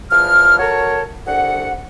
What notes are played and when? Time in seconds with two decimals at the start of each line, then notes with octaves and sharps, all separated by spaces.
0.10 E2 F3 F6
0.59 F#4 A4 A#4 C#5 A5
1.27 C2 D3 F#5